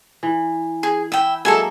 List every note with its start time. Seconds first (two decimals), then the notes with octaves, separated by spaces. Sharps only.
0.23 E3
0.83 G#4
1.12 E4 E5 G5
1.45 F#3 G#3 A#3 A4 E5 G#5